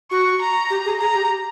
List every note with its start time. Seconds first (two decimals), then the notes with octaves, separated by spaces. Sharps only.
0.11 F#4 C#6
0.41 A#5
0.70 G4
0.85 G#4
1.00 G#4 A#5
1.14 G4